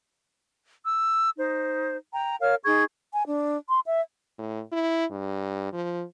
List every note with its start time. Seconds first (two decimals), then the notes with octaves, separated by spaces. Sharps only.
0.83 E6
1.37 D#4 C5
2.14 G5 A#5
2.41 A#4 C#5 F5 F6
2.64 D#4 G#4 C#6 G#6
3.13 G#5
3.27 D4
3.69 C6
3.86 E5
4.38 A2
4.72 E4
5.11 G2
5.73 F3